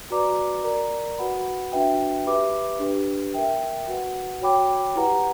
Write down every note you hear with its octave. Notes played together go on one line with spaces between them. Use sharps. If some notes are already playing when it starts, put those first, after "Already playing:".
F#4 B4 D5 A#5 D6
A#4 D5 A#5
F#4 B4 F#5 B5
D4 F#4 B4 E5 G5
G4 B4 E5 B5 D6
D4 G4 B4
A#4 E5 G5
F#4 B4 F#5
F#4 C#5 G5 B5 D6
E4 G4 B4 F#5 A#5